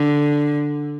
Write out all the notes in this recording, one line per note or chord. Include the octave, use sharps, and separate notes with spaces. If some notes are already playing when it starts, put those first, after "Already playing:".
Already playing: D3